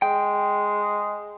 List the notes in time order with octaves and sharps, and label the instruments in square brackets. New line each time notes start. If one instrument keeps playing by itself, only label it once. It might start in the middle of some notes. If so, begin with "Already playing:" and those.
[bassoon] G#3 [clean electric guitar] G5